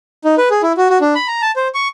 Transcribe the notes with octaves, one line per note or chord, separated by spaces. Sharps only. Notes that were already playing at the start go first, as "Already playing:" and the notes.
D#4
B4
G#4
E4
F#4
F#4
D4
B5
A#5
A5
C5
C#6